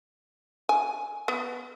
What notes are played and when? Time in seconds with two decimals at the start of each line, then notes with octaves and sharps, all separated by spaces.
0.69 G#5
1.28 B3